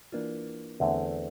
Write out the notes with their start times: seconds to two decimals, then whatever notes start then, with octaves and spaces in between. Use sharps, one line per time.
0.12 E3 A#3 D4 F4
0.80 E2 D3 A3 C4 E4